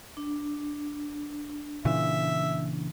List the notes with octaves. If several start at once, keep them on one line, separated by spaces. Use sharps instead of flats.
D4
A#2 C#3 E3 E5